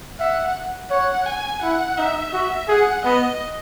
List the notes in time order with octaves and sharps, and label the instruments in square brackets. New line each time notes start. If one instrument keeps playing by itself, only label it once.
[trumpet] E5 [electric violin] F#5
[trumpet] C#5 [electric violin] F#5
[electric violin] G#5
[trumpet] E4 [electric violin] F#5
[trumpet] D#4 [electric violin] E5
[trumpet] F#4
[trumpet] G#4 [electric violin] F#5
[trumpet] B3 [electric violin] D#5